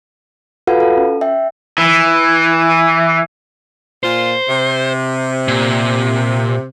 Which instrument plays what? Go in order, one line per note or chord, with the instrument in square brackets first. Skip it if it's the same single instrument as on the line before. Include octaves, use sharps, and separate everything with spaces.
[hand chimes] F4 F#4 A4 B4 F5 F#5
A4
C#4
E5 G5
[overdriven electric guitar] E3
[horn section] A#2 F4 [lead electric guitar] C5
[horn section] C3
[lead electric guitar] A#2